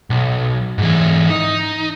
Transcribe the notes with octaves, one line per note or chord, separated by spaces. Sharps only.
B1
G#2 E3
D#4